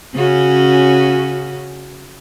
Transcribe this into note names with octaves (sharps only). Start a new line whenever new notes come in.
C#3 C#4 F#4